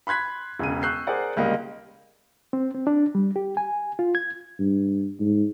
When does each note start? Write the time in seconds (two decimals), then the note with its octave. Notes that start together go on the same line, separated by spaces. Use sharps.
0.07 B5 C6 F#6 G#6 B6
0.59 E1 C#3 D#7
0.83 C#6 E6 F#6 G6 C7
1.07 G#4 A#4 C5 D5 F#5
1.36 D1 C#2 G3 A#3 D#5
2.53 C4
2.75 C4
2.87 D4
3.15 G3
3.36 G4
3.57 G#5
3.99 F4
4.15 G#6
4.59 G2
5.20 G#2